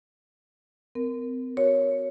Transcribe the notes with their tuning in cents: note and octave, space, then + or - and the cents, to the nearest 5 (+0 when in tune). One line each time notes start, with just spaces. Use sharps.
C4 -40 A#4 +0
F#4 +0 A#4 +0 C#5 +0